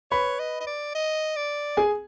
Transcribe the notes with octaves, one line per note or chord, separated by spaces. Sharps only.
B4 C#5 B5
D#5
D#5
D5
D#5
D5
G#4 G#5